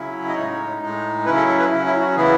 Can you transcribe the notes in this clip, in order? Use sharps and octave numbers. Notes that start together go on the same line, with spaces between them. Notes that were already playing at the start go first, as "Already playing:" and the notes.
Already playing: C#3 F#3 C#4 E4
D#5
A2 G#3 D#4 C#5
A2 G#3 D#4
C#3 F#3 C#4 E4 B4
A4
A4
B4
F#3 C#4 E4
E4
F#4
C#3 E3 B3 E4 G#4